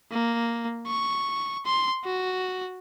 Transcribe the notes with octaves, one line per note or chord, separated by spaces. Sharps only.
A#3
C#6
C6
F#4